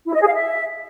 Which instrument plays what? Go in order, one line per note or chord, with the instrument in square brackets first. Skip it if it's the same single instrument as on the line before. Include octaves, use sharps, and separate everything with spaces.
[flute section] E4
D#5
G#4
F5
E5